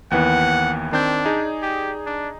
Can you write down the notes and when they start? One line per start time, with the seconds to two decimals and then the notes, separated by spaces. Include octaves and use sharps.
0.11 D#2 E3 B3 F#5
0.92 D#3 C4 D4 G6
1.25 D#4 G#4 D5
1.62 G4
2.06 D4